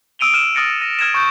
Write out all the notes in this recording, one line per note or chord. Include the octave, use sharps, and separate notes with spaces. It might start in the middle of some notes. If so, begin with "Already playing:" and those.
D#6 E6 D7 D#7 F7 G7
F6 D#7 E7
D#6 F6 A6 A#6 C#7 D7
A#6 D#7
F6 G#6 A#6 E7
C#6 F6 G6